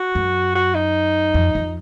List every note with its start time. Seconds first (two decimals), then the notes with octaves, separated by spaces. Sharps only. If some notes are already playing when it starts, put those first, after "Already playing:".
Already playing: F#4
0.15 F#2
0.55 F#4
0.75 D#4
1.34 F2
1.55 F2